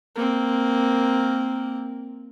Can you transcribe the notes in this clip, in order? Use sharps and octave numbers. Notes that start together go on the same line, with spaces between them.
A#3 C4